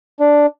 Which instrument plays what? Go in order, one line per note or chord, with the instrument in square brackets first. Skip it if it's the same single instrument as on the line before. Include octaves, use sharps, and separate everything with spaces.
[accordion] D4